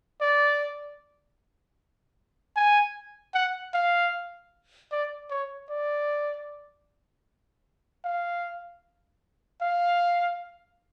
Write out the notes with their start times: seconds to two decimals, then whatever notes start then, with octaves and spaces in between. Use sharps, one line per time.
0.21 D5
2.56 G#5
3.34 F#5
3.74 F5
4.92 D5
5.30 C#5
5.70 D5
8.04 F5
9.61 F5